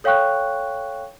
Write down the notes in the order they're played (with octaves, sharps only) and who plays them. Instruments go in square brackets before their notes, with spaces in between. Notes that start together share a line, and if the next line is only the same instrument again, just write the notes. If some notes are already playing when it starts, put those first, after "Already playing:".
[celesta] A4 C#5 F5 G5 C#6 F#6